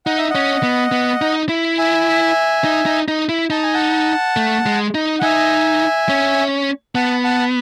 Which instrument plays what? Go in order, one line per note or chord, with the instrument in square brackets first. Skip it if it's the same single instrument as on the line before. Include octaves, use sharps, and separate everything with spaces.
[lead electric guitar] D#4 [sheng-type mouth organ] F#5
[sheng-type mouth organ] E5
[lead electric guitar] C#4 [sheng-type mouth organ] D#5 F#5
[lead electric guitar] B3
B3
D#4
E4
[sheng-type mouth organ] E5 G#5
[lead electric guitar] D#4
D#4
D#4
E4
[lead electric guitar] D#4 [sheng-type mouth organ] A5
[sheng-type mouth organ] G#5
F#5 A5
[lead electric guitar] A3
G#3
D#4
[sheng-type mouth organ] F#5
[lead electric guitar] D#4 [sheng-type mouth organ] E5 G#5
[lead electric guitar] C#4
[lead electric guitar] B3 [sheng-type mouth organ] F#5 A5
[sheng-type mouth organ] F#5 A5